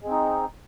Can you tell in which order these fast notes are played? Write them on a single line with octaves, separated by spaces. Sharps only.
G#3 C4 D#4